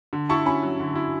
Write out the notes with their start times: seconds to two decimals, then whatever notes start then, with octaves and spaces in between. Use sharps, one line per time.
0.13 D3
0.29 E4 A5 C#6
0.45 C#4 G#5 B5
0.62 F#3
0.80 D3
0.95 E4